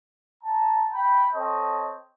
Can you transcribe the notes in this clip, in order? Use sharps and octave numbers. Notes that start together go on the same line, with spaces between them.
A5 A#5
G5 B5
C4 A4 C#5 D#5